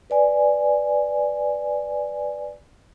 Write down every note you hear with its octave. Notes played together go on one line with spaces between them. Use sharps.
B4 D5 G#5